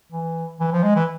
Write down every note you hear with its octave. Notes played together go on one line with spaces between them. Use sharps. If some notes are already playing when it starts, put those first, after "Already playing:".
E3
E3
F3
G#3
E3